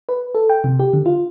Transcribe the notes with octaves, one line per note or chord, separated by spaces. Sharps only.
B4
A4
G5
C3
G4
D3
F4